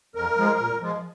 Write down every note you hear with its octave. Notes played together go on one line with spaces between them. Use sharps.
F2 A#4
F3 G#3
A#2
F3 G#3